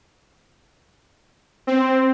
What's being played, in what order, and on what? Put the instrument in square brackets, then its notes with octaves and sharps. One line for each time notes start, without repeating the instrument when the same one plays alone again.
[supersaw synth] C4